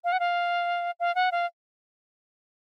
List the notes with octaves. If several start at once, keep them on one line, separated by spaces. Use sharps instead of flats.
F5
F#5
F5
F5
F#5
F5